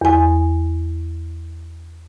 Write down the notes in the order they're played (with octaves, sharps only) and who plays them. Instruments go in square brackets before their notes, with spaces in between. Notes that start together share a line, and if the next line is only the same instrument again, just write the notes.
[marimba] E2 G#5